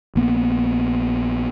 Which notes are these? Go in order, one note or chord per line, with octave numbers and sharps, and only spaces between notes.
A#1 A#3 B3